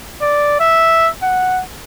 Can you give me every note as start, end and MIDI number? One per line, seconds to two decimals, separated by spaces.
0.22 0.56 74
0.60 1.08 76
1.23 1.62 78